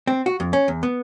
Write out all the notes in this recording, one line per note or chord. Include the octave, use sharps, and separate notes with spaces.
C4
F#4
F2
C#4
E2
B3